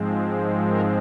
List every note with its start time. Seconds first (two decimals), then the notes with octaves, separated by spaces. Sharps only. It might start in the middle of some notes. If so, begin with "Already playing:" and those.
Already playing: G#2 F3 G#3 C4
0.67 A#4